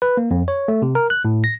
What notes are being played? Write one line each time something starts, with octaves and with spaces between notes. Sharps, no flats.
B4
A#3
F2
C#5
A3
C3
A#4
F#6
A2
A#6